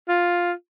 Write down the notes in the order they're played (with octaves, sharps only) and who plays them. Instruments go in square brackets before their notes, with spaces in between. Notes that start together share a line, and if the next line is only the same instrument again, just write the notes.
[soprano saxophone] F4